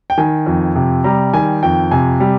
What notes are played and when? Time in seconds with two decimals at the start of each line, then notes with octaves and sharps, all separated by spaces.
0.10 G5
0.18 D#3 G#5
0.46 F2
0.75 C3
1.04 G3 A#5
1.33 D#3 G#5
1.63 F2 G5
1.91 C3 G#5
2.20 G3